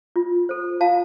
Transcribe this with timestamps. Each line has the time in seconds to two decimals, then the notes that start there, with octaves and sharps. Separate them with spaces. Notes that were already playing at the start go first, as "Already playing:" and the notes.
0.16 F4
0.49 A4 C5
0.81 F4 F5 A5